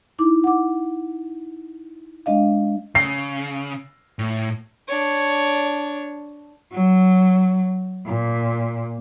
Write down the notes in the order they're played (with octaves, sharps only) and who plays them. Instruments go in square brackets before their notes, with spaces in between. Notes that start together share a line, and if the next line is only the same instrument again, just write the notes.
[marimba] D#4 E4 D6
F#5 D6
G#3 D4 D#5 F5
[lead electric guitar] C#3 [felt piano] C7
[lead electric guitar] A2
[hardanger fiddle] D4 C#5
[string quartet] F#3
A#2